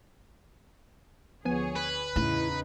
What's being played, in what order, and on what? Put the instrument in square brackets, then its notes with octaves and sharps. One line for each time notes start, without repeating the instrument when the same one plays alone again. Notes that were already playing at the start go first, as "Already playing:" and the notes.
[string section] D2 G#4 C#5 [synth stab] F3 B3 G#5
[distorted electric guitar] B4
[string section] E2 C#3 D#4 [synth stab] A2 [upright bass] E4